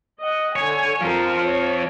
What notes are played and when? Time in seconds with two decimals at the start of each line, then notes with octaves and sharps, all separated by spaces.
0.20 D#5 F#5
0.56 D3 C#5 G#5
1.01 F3 C4 F4 A#4
1.45 C#5